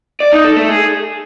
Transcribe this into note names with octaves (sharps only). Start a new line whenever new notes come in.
D5
D#4
A4
A3
G#4